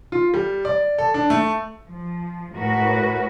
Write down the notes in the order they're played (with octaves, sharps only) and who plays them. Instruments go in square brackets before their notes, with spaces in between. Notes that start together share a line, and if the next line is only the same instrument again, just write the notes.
[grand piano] F4
G3
D5
A4
D4
A3
[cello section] F3
A2 F#4 A#4 B4